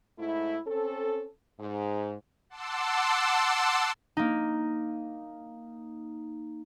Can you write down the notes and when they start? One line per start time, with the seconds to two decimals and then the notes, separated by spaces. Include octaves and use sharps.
0.19 G#2 A3 E4
0.67 C4 C#4 A4
1.60 G#2
2.50 F#5 A5 C6 D6 E6
4.17 A#3 D#4